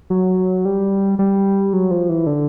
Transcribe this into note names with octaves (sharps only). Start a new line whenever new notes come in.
F#3
G3
G3
F#3
F3
E3
D3